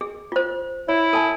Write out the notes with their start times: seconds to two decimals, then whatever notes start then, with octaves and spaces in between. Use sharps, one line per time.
0.01 G#4
0.32 F4 C5
0.88 E4 C#5
1.13 A4 G#5 A5